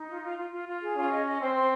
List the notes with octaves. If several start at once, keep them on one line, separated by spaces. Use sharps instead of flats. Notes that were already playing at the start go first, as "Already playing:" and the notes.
Already playing: D#4
F4
F4
F4
F4
F4
G#4
C#4 F4
D#5
D#5
C4 C5
C5